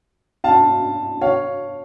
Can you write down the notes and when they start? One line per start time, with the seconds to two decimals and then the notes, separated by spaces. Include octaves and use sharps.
0.44 F5 A5
1.21 C#5 F5